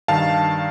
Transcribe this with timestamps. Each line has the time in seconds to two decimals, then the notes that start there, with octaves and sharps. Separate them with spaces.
0.08 G2 D#3 F5 A5